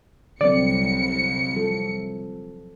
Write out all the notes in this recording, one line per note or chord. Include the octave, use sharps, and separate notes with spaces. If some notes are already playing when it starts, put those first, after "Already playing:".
C2 D3 F#3 C4 D5 C#7
F3 A4